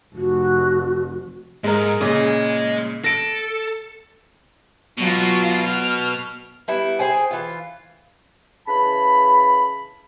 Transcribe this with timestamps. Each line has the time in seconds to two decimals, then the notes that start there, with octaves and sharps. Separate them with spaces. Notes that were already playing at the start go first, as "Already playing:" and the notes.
0.15 F1 F#4
1.64 G#2 G#3 A#4
2.01 A#2 C#3 G#4 D#5
3.04 A4 A#6 D7
4.98 B2 F#3 F4
5.65 F6
6.68 G3 B3 E4
6.99 G#4 C5 G5 G#5
7.31 E3 F4
8.67 C#3 E3 A5 B5